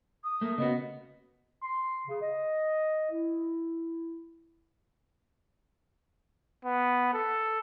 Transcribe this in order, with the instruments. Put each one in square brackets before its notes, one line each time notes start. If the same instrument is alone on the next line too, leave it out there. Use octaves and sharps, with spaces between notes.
[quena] D#6
[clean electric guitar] A3 A#3
[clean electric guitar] C#3 B3 F#4 [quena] D#5
[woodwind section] C6
C#3
D#5
E4
[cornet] B3
A4